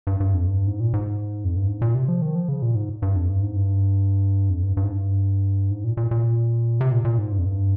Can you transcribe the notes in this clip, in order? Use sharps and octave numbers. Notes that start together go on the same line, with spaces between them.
G2
G2
F2
G2
G#2
A#2
G#2
F2
G2
G#2
A#2
C3
F3
D#3
F3
C#3
A#2
G#2
G2
F2
G2
G#2
G2
F2
G2
G2
G#2
G2
G#2
A#2
A#2
A#2
C3
A#2
A#2
G#2
G2
F2
G2